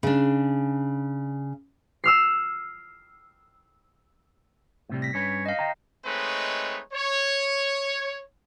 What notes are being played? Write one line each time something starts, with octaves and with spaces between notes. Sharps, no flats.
C#3 D4
E6 F6 C7
A2 C3 G3
A#6 B6
G2 C#4 B4 C#5
D#4 D#5 F5
G5 A#5
G#3 A3 C4 D#4 B4 C#5
C#5